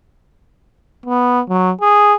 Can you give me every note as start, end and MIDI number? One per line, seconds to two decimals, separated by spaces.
1.06 1.41 59
1.49 1.71 54
1.81 2.15 68